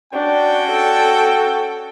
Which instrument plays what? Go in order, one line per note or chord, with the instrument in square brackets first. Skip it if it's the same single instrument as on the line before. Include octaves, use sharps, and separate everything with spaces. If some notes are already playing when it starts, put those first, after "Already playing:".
[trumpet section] C#4 F#4 G5 [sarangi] D4
[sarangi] A4